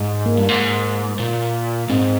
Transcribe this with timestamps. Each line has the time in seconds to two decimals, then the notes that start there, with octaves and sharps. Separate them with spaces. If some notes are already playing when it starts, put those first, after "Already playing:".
Already playing: G#2
0.26 A#3
0.37 G2
0.49 G#2
1.19 A#2
1.89 G#2 C4